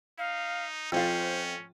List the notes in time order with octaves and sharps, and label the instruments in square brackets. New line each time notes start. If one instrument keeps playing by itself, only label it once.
[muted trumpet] D#4 [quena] F5
[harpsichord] F2 [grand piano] F3 F4 [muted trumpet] C#4 [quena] C5